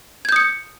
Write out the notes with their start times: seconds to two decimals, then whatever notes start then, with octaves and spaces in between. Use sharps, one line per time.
0.25 G#6
0.29 G6
0.32 D#6
0.36 C#7